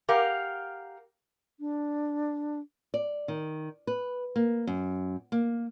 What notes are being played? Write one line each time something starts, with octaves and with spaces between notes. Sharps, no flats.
G4 A#4 F5 F#5
D4
D5
D#3
B4
A#3
F#2
A#3